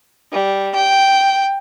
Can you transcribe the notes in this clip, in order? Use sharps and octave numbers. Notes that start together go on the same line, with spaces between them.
G3
G5